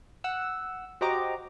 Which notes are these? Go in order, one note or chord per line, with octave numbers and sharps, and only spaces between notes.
F#5 E6
F#4 G4 C5 D#5 A#5 D6